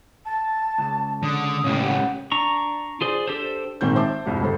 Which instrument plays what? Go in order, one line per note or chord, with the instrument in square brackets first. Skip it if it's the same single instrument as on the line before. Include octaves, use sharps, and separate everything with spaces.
[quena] A5
[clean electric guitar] C#2
[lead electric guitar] D3 [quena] D#6
[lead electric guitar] C#2 A2 [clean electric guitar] C#4 D4 G4
[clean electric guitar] B3 C#4 F#5 [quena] G4
[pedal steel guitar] D4 A#5 C#6
F4 G#4 C5 D5
D4 G4 A4 C5
[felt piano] A#1 G#2 D#3 C4 G6
C5 E5 A5 D6
C2 F2 G#2 G3
G1 C#2 A4 C5